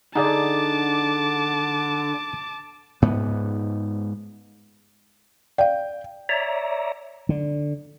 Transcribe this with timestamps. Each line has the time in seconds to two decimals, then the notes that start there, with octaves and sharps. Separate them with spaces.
0.15 D3 D#4 G#4 D5 A5 D6
3.02 G#2 B3
5.58 D5 F5 G5
6.29 C#5 D5 E5 A#5
7.29 D3